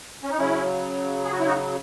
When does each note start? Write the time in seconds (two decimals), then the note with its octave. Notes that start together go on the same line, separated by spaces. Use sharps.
0.23 C#4
0.31 D#4
0.38 C#3 F#3 C#4 E4
1.25 G#4
1.31 F#4
1.40 E4
1.46 D#4 F#4